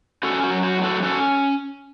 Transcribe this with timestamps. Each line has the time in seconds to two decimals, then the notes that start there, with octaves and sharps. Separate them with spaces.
0.23 C#4 F#4 A4
0.43 F#4
0.51 F#3
0.63 F#4
0.77 A2
0.84 F#4 A4
1.03 C#4 F#4 A4